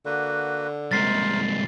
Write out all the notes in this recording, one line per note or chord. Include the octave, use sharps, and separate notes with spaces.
D3 A#3 F#4 B4
C2 G#2 A#4 C5 A6 B6 C7